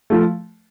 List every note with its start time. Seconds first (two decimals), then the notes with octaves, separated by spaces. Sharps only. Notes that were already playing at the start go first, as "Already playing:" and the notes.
0.10 F3 A3